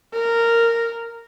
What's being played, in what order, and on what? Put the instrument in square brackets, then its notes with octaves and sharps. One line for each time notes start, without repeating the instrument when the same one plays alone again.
[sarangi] A#4